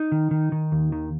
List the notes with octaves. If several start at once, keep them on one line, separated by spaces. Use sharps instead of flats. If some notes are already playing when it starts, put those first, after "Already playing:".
Already playing: D#4
D#3
D#3
D#3
D#2
D#3